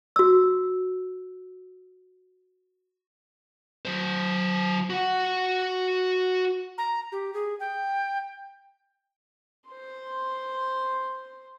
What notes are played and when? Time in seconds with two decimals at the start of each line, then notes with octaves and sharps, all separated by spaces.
0.16 F#4 E6
3.85 F#3 C5
4.90 F#4 F#5
6.78 A#5
7.12 G4
7.34 G#4
7.60 G5
9.69 C5 C6